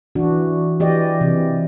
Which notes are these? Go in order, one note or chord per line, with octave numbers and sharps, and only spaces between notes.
E3 D4 F#4
E3 G4 D5 D#5
C3 E3